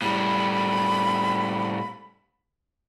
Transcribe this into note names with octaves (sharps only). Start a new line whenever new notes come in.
A2 G3 B5